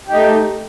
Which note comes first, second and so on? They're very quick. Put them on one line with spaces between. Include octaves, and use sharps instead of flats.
G4 D#4 A3